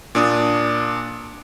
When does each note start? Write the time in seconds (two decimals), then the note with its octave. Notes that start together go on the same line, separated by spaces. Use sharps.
0.15 A#2 D4 D#6